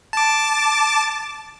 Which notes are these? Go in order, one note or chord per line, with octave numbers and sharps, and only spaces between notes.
A5 D6